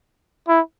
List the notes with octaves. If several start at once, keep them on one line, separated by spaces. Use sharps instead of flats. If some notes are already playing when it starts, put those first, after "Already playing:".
E4